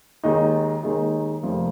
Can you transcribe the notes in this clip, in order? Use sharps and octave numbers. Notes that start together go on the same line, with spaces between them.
D#2 D#3 G#3 D#4
D#2 D#3 G#3 D#4
F1 F2 C3 F3 A#3